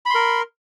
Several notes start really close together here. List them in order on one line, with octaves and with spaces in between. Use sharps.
B5 C6 A#4